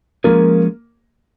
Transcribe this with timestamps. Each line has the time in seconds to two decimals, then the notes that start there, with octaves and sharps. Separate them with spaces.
0.24 F3 G#3 A#3 C#4 F4 G#4